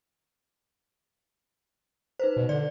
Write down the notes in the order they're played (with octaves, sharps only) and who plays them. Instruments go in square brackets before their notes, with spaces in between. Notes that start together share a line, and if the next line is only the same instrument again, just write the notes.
[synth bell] D#4 B4 C5
[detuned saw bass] B2
[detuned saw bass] D3 [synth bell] D5